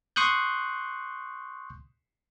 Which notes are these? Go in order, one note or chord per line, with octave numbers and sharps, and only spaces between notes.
C6 C#6 D#6 F#6 G6